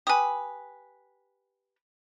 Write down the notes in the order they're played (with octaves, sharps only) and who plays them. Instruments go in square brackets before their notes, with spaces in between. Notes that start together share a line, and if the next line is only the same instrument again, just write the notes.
[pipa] G4 B4 [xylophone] G#5 D#6